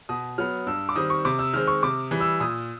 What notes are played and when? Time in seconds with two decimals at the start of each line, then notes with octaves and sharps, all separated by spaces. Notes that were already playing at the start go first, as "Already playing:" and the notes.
0.09 B2 D#6
0.38 F#3 B3 F6
0.67 G2 E6
0.89 D6
0.96 D#3 G3 C4 D#6
1.10 C#6
1.25 C3 D6
1.39 E6
1.53 D#3 G#3 C4 F6
1.67 C#6
1.83 C3 D6
2.11 E3 G3
2.20 E6
2.40 A#2 D#6